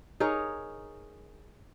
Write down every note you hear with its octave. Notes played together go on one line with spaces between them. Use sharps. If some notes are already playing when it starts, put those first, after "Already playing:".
D#4 G#4 A#4 C#5